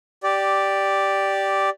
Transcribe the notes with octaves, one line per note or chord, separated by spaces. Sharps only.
G4 D5